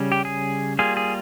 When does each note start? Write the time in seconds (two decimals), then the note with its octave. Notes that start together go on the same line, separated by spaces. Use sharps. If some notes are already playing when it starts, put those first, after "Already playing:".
Already playing: C#3 G3 C#4
0.12 G4
0.25 G#4
0.79 G3 A#3 F4 G#4
0.97 G#4